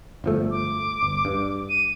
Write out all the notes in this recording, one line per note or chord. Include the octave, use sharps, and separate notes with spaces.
G1 F3 A3
D6
G1
G2
D#7